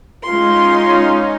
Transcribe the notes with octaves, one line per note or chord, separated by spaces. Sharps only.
G#3 C#4 D#4 F4 C6